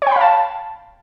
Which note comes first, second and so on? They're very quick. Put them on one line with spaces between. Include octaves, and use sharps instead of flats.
C#5 G5 B5 F5 A5